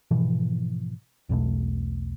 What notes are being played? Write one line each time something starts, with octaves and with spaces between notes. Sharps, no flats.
G#2 B2 E3 F3
B1 E2 B2 A3